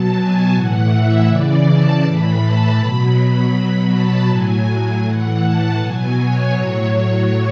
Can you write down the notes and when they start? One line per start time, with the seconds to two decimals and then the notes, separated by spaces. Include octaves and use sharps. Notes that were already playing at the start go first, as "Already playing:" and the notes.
Already playing: B2 F#3 A5
0.15 G#5
0.52 A2 E3 F#5
0.90 E5
1.27 C#3 E3 D5
1.65 A5
2.03 A2 E3 B5
2.41 A5
2.78 B2 F#3 B5
3.53 B2 F#3
3.91 A5
4.29 A2 F#3 G#5
5.04 A2 E3 F#5
5.41 A5
5.79 B2 F#3 G#5
6.17 C#5
6.54 A2 F#3